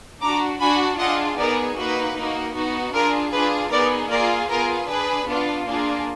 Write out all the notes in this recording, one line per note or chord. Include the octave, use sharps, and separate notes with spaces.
D4 F#4 A#5 D6
D4 F#4 G#5 B5
D4 F4 G#4 D#5 F#5
B3 D#4 G#4 A#4 D5
A#3 D#4 F#4 B4
A#3 D#4 F#4
B3 D#4 F#4
D4 F4 G#4 A#4
D4 F4 G#4 B4
B3 D#4 G#4 A#4 D5
A#3 F4 G#4 A#4 D5
B3 F4 G#4 A#4
D4 G#4 B4
B3 D4 F4
A#3 D4 F4 G#4